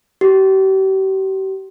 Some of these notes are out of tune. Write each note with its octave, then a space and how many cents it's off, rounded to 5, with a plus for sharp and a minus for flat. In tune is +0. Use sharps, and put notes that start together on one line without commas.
G4 -40